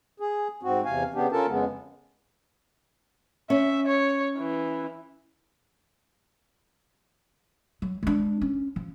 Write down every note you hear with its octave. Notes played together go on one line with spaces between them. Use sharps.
G#4
G#2 C4 F#4
E2 C3 F5 G#5
C#3 B3 D4 G4
C#4 F4 A4 A#4 A5
F2 C#3 G#3 B3
C#4 E5
C#5
E3
F#3
G#3 D4
C#4
F3